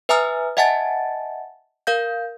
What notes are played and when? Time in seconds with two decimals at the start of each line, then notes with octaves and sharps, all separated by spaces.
0.09 B4 E5 G#5 A#5 D#6 F6
0.57 D#5 E5 F#5 G#5 A5 A6
1.87 A#4 F5 G6